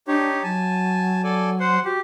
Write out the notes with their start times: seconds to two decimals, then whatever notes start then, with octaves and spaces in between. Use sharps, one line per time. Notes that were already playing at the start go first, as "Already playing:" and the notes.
0.08 D4 D#4 G4 C#5
0.43 F#3 G#5 A5
1.24 A4 D5 G#5
1.60 C5 F#5 C6
1.85 F#4 G4